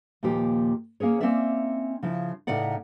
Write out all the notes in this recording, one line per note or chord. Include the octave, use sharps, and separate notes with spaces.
D#2 A#2 F3 A#3 G4
A#3 C#4 G#4 C#5
A#3 C4 C#4 D#4 D5 E5
C#3 F3 E4
A2 C#3 D#4 D5 F#5